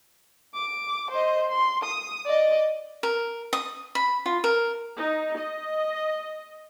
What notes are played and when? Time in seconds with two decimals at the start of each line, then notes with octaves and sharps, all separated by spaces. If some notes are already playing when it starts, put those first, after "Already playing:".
0.54 D6
1.11 C5 D#5
1.49 C6
1.84 D#6
2.26 D5 D#5
3.03 A#4
3.53 D#6
3.95 B5
4.26 F4
4.44 A#4
4.98 D#4
5.37 D#5